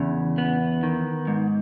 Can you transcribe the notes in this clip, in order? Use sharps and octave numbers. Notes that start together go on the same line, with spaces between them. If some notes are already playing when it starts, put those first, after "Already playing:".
Already playing: E2 C#3
B3
D#3
G#2